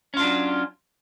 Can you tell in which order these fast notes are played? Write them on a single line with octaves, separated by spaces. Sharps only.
C#4 F4 D4 F#3